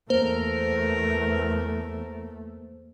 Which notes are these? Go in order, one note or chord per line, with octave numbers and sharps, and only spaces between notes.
E2 A3 A#3 A#4 C5